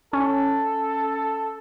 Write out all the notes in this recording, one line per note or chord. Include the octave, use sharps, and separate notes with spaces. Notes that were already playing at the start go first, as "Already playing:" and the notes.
C#4 A4